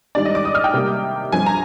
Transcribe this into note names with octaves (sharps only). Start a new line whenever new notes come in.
G#2 D#3 G3 D4 D5
D#5
D6
D#6
F6
G5
C3 G3 A#3
G2 F3 C4 G#5
A#5